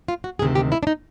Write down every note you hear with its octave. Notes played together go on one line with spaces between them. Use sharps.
F4
F#4
D2 C3 D#3 G#3 G#4
G4
E4
D4
D#4